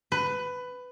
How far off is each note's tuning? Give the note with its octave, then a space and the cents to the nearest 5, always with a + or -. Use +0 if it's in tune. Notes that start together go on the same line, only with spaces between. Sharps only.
B4 +15